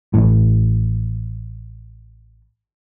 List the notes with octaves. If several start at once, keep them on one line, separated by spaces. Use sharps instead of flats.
A1 A2